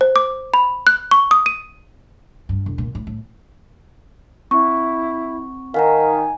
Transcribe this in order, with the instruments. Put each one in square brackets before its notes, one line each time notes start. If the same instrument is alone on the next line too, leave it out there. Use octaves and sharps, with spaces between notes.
[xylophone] C5
D6
B5
F#6
C#6
D#6
D#7
[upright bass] G2
E1
A#2
A2
A2
[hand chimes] C4 [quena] E4 [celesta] C#6
[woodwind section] D#3 [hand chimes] F5 F#5 A#5 [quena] G#5